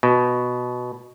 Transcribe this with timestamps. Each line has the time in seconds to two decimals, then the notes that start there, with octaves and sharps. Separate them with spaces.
0.03 B2